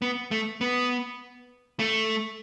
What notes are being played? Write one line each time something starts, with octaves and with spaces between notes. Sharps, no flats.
B3
A3
B3
A3